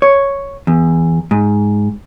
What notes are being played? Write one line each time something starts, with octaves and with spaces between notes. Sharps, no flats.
C#5
E2
G#2